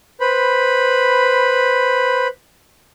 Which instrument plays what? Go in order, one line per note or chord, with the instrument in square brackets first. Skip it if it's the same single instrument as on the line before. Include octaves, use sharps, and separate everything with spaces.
[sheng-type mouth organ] B4 C5 B5